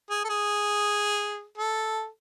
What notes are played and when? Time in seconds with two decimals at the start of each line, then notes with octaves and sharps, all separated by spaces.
0.10 G#4
0.24 A4
0.30 G#4
1.58 A4